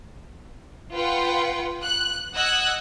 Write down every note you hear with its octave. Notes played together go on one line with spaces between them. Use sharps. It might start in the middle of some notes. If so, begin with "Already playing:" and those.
F4 B4 F#5 G5
F#6
D#5 F#5 E6 F#6 G#6